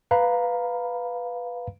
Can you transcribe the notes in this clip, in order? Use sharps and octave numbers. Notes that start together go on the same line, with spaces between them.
B4 F5 A#5 B5